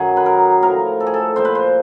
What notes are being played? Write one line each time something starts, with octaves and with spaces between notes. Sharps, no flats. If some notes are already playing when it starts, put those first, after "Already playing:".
Already playing: F#2 D#3 F#3 G#4
B4
A#4
A2 F3 A#4
A4
G#4
A4
A#2 F3 C5
B4
C5